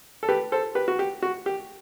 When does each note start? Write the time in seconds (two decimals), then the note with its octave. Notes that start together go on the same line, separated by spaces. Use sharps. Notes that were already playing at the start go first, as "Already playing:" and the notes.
0.23 A4
0.29 G4 B4
0.52 A4 C5
0.75 G4 B4
0.88 F#4
0.99 G4
1.22 F#4
1.46 G4